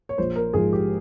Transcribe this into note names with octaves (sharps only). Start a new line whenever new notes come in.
C#5
A#1 C5
A#4
G#2 F3 G#4
G4